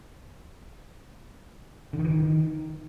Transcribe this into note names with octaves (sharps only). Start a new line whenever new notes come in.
D3
D#3
E3
D#3